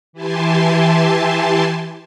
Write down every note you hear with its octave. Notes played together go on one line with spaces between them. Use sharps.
E3 E4 G4 G#5 A5 C6